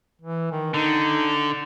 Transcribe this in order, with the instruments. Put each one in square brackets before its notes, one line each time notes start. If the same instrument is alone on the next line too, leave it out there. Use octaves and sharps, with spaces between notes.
[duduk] E3
D#3
[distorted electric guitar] D3 [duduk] D#4